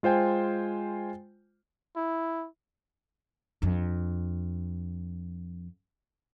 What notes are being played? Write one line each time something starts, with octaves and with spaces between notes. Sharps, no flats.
G#3 F4 C5 G5 G#5
E4
F2 D4